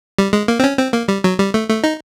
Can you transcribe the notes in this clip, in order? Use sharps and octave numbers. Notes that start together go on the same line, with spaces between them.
G3
G#3
A#3
C4
C#4
C4
A#3
G3
F#3
G3
A3
A3
D#4